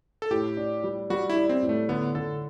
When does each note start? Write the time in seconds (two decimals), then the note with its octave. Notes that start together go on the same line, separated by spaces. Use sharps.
0.22 A4
0.31 A2 G4
0.57 D4
0.84 G3
1.10 G3 F#4
1.30 E4
1.36 D4
1.49 C4
1.62 A2
1.69 A3
1.89 D3 B3
2.15 D3 A4